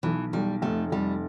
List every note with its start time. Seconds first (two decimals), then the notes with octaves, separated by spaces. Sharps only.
0.03 B1 E3
0.33 B1 G3
0.62 F1 A3
0.92 F1 G3